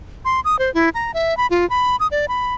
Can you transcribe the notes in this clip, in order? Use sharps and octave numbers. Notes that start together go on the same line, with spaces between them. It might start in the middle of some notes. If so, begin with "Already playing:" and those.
C6
D#6
C5
E4
A#5
E5
B5
F4
B5
D#6
D5
B5